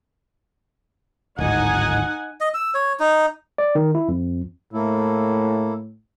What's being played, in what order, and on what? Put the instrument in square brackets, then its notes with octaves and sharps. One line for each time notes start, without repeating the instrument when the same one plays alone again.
[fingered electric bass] D1 G#1 [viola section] D#4 F#5 G#5
[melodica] D#5
E6
C#5
D#4
[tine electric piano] D5
D#3
E4
F2
[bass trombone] A2 [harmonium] A#3 E4 A4